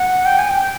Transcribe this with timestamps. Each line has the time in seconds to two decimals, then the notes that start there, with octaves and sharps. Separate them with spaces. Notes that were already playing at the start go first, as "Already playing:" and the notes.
Already playing: F#5
0.25 G5
0.39 G#5
0.50 G5